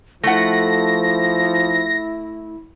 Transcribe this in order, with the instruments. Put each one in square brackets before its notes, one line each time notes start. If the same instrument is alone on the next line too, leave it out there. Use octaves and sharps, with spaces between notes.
[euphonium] F3 [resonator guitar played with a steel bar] A3 F#5 [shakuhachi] E4 [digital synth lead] A#6